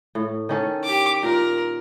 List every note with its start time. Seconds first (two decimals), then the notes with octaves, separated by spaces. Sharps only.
0.15 A2
0.49 D#3 C#4 A4
0.84 G4 D6
1.23 A#2 A#4